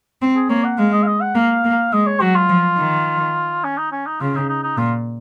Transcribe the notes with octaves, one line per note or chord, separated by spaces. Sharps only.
C4
G#4
A#3 C#5
F#5
G#3 F5
D#5
F5
D#5
F#5
A#3 F5
A#3
G#3 D#5
C#5
F#3 F#4
F4
F3
D#3
C#4
D#4
C#4
D#4
C#3 F4
D#4
D#4
D#4
A#2 F4